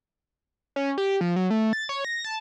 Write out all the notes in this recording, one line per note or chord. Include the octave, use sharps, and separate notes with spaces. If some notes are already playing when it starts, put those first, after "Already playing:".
C#4
G4
F3
F#3
A3
A6
C#5
A#6
A5